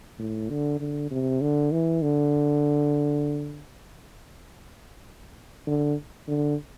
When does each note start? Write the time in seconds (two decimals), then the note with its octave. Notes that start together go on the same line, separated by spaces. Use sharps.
0.19 A2
0.50 D3
0.80 D3
1.11 C3
1.41 D3
1.72 E3
2.02 D3
5.67 D3
6.28 D3